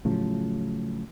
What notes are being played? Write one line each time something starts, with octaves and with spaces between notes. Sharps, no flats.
A2 C#3 F3 F#3